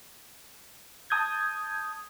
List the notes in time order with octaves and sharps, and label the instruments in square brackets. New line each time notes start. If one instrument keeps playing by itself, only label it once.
[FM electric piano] A5 D#6 G6 G#6